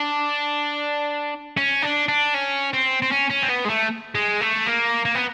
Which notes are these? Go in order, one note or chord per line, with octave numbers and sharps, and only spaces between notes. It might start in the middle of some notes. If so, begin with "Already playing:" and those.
Already playing: D4
C#4
D4
D4
C#4
C4
C4
C#4
C#4
C4
B3
G#3
A3
G#3
A3
A#3
A#3
B3